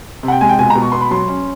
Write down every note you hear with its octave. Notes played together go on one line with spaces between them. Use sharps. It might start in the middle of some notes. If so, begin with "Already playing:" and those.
C3
F#5
G5
G#3 G#5
G5
B2 G#5
A#5
B2
C#6
B3 C6
B5
F#3 C6
C#4